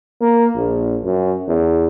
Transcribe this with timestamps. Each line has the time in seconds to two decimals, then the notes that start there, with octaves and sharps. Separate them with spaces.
0.21 A#3
0.56 A#1
1.04 F#2
1.48 E2